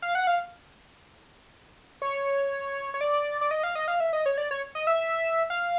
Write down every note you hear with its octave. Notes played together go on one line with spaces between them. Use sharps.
F5
F#5
F5
C#5
C#5
D5
D5
D#5
F5
D#5
F5
E5
D#5
C#5
D5
C#5
D#5
E5
F5